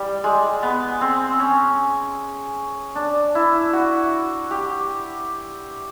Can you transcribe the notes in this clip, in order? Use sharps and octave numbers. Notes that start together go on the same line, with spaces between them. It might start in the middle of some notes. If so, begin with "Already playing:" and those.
Already playing: G3
G#3
B3
C4
C#4
D4
E4
F#4
G4